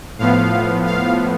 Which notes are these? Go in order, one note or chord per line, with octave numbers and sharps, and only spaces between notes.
A2 F3 B3 F5
F5